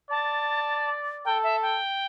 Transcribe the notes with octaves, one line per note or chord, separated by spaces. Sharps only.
D5 A5
A4 G5
E5
G5